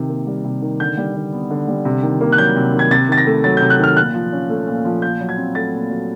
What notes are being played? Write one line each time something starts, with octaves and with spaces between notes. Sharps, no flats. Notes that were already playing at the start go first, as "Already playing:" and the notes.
Already playing: C3 D#3
A#3
G3
C3
D#3
D3 G6
G3
D3
B3
D3
G3
C3
D#3
A#3
F#6
F#3 G6
C3
D#3
G#6
C3 A6
D#3 A6
A#6
A3
F#3 A6
G6
C3
F#6
D#3 F6
A#2 F#6
F3
C#4
A3
A#2
F3
A#2 G6
F#3
G#6
C4
A3 A6
A#2
F#3